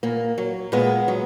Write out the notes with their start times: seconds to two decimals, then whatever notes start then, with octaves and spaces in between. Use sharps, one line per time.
0.03 A#2 A#3
0.38 F#3
0.72 A#2 G#3 B3
1.08 F#3